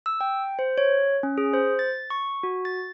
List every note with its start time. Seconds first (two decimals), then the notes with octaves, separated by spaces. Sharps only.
0.06 E6
0.21 G5
0.59 C5
0.78 C#5
1.23 C#4
1.38 G#4
1.54 C5
1.79 A6
2.10 C#6
2.43 F#4
2.65 A6